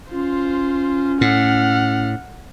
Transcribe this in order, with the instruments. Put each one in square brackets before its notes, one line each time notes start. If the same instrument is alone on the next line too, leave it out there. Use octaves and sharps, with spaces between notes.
[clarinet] C#4 [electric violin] F4 C5
[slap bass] A2 [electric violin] F#5 F6